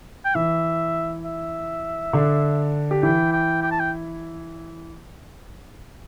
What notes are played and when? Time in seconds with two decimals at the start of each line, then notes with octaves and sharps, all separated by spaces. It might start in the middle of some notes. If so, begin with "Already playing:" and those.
0.25 G5
0.35 E3 E5
1.24 E5
2.13 D3 D4
2.91 G4
3.03 E3 E4 G5
3.32 G5
3.62 G5
3.71 A5
3.79 G5